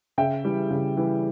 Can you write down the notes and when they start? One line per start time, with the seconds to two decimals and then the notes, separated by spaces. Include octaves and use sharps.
0.18 C#3 E5 G5
0.44 E3 G3
0.70 C#3
0.97 E3 G3